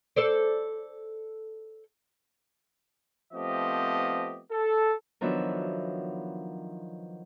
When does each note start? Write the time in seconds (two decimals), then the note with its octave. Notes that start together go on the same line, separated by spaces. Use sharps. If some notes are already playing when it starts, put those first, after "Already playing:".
0.16 A4 C5 D5
3.33 F3 A3 B3 C4 G4 D#5
4.50 A4
5.21 D#3 F3 F#3 B3 D4 E5